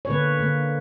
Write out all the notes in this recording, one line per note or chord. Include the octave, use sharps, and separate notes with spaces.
C#5
D3 A#3 B4
D3 A#3